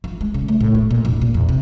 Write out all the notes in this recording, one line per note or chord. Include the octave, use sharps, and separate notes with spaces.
F3
G#3
C#3
A3
A2
A3
A#2
E1
A#2
E2
C3